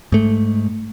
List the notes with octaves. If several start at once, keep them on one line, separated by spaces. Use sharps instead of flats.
G#2 A3